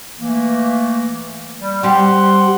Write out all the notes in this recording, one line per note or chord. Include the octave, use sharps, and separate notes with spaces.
E3 A3 A#3
G3
G3 C4 G4 F#5 C6